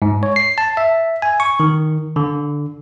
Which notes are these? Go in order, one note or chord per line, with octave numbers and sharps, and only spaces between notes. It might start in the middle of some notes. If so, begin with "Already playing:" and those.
G#2
C#5
C7
A5
E5
G#5
C#6
D#3
D3